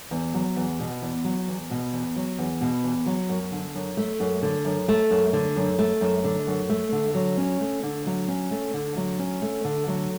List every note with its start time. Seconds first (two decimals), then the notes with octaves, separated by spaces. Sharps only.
0.11 E2
0.34 F#3
0.56 E2
0.80 B2
1.02 E2
1.24 F#3
1.48 E2
1.70 B2
1.93 E2
2.16 F#3
2.38 E2
2.61 B2
2.84 E2
3.06 F#3
3.29 F#2
3.52 D3
3.75 F#2
3.97 A3
4.20 F#2
4.43 D3
4.65 F#2
4.88 A3
5.10 F#2
5.33 D3
5.56 F#2
5.79 A3
6.01 F#2
6.24 D3
6.47 F#2
6.69 A3
6.92 D3
7.15 F#3
7.37 C#4
7.61 A3
7.83 D3
8.06 F#3
8.28 C#4
8.51 A3
8.74 D3
8.97 F#3
9.19 C#4
9.42 A3
9.64 D3
9.87 F#3